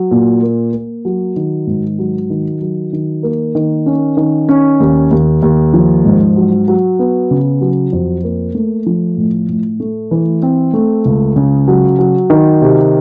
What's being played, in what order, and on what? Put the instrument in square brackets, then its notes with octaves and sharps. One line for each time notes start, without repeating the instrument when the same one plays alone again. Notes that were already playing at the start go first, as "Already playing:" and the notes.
Already playing: [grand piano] F#3
A#2
A#3
A#3
F#3
D#3
G#2
F#3
D#3
F#3
D#3
A#3
D#3
C#4
D#3
C#4
D#2
D#2
D#2
F3
G#2
F#3
F#3
B3
C#3
F#3
F2
A#3
A3
F3
A2
A2
A3
E3
C4
A3
C#2
C#3
F#3
F#3
D#3
C3